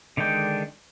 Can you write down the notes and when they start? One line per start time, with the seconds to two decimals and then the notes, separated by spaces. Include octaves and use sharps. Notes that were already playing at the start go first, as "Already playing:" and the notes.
0.17 D3 D#3 G#3 D4 G5